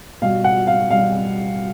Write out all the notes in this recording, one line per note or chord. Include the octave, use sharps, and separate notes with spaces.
B2 G3 F5
F#5
F5
B2 G3 F5